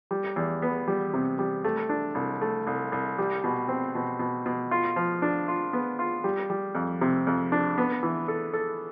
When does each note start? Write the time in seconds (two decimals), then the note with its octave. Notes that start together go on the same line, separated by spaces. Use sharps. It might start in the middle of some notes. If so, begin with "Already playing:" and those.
0.11 G3
0.36 E2
0.62 B3
0.88 G3
1.14 C3
1.39 G3
1.64 A3
1.89 D4
2.15 C2
2.41 A3
2.67 C2
2.92 C2
3.18 G3
3.44 B2
3.68 C4
3.95 B2
4.19 B2
4.46 B2
4.71 F4
4.96 F3
5.22 D4
5.48 F4
5.73 B3
5.99 F4
6.24 G3
6.50 G3
6.75 F2
7.01 C3
7.27 F2
7.52 D4
7.78 B3
8.03 E3
8.28 A4
8.53 A4